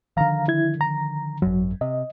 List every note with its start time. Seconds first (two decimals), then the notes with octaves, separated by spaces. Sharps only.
0.17 D3 D#3 F3 F5 A#5
0.48 E4 G#6
0.81 A#5
1.42 G#1 F#2 F#3
1.81 C3 D#5